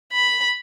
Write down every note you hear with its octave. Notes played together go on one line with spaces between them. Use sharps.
B5